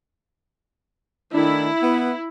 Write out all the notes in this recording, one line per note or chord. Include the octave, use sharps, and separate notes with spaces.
D#3 A3 D4 E4
B3 B4